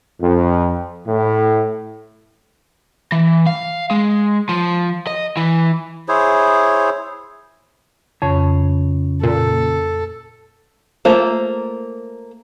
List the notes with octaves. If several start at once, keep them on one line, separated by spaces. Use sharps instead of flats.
F2
A2
E3
F5
G#3
F3
D#5
E3
E4 G#4 C5 C#5
F2 C#3 C#5
A#2 A4
A3 A#3 F4 C5